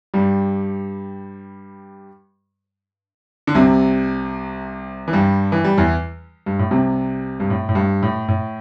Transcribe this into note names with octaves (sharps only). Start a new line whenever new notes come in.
G2 G3
D3
C2 C3
E3
G2 G3
E3
G3
E2 E3
G2
A2
C2 C3
G2
A2
A2
G2
A2
A2